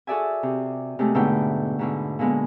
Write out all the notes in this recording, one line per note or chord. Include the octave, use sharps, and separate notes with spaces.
F#4 G#4 A4 D5 E5 G#5
C3
C3 G#3 A3
G#2 B2 D3 A3 F#5 G5
G#2 B2 D3
A#2 D3 G#3 B3